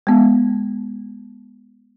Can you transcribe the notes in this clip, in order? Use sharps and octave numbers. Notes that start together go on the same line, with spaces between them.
G#3 B3